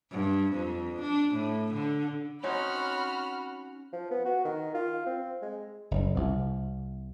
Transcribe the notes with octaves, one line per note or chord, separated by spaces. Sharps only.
G2
F2
D4
A2
D3
C4 C#4 D#4 F#4 C#5 B5 F6
F3
B3
F#4
D#3
F4
C4
G#3
F#1
C2 C3